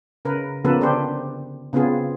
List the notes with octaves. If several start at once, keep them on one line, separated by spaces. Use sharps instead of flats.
C#3 A#4 B4
C#3 F3 A#3 B3 A4 B4
D3 D4 G4 C5
C#3 B3 C4 F4 G#4